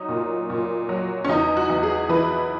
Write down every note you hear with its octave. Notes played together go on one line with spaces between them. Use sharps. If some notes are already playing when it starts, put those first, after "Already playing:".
Already playing: F#3 D#4
A#2
A#2
F#3
C#4
E2 D#4
F#4
E2
G#4
E3 B4